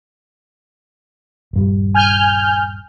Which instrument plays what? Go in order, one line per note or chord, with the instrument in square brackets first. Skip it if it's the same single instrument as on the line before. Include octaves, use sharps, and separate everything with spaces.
[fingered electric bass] D#1 G2 G3
[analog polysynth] G#5 F6 G6